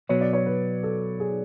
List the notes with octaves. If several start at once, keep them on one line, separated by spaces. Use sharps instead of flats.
B2 F#3 B3 C#5
D5
C#5
B4
A4
G#4